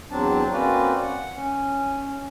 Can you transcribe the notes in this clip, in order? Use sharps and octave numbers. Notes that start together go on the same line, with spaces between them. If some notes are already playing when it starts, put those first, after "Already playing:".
E2 F#3 C4 D4 A5
A#3 C4 C#4 F#4 B4 D5
F#5
C#4